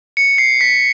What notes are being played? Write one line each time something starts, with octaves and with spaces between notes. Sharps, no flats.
C#7
C7
B6